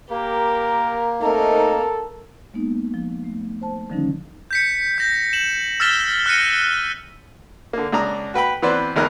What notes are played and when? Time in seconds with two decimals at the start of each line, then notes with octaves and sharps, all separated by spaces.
0.10 A#3 G4 A#4
1.21 A3 C4 D#4 A4 A#4
2.54 G#3 A#3 B3 D#4
2.94 F3
3.24 A3
3.61 C5 A5
3.90 D3 D#3 F3 G3 C#4 D#4
4.51 G6 B6 C#7
4.98 G6 A#6
5.33 E7 F#7
5.80 E6 F6 A6 B6 E7 G7
6.26 F6 F#6 A#6 C#7 D#7
7.73 D3 A#3
7.92 C#2 D4 A#5 D#6
8.34 F#4 B4 G5 B5
8.62 E3 B3 C4 B4 C5 D5
8.96 G#1 E2 D#4 A#4 D#5 F#6